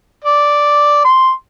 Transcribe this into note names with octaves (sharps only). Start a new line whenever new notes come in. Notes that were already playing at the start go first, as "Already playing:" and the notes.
D5
C6